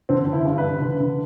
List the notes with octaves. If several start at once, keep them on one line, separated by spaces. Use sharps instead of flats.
D3 C4
D3
E4
G2
B4
D3
D3
D3